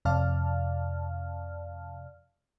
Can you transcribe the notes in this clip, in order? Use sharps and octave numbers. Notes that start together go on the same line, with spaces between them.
F2 C3 D5 F5 A5 F6